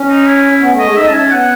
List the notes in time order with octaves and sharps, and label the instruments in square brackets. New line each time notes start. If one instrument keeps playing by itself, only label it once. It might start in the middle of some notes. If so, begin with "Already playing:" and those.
Already playing: [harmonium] C#4
[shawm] D#4
E4
[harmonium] C#4
B3
A3
[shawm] D#5
[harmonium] G#3
[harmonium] D#4 [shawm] E5
[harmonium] C#4 [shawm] A5
[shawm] G#5
[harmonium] C#4
[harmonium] B3 [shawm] F#5